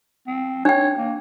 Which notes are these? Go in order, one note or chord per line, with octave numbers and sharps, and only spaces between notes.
C4
D4 C#5 G5
A#3